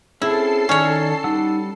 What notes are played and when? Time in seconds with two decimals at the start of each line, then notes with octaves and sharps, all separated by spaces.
0.22 C4 C#4 E4 G#4 A4 A5 C7
0.69 D#3 C#4 C#5 D5
1.24 G3 D#4 F#5 E6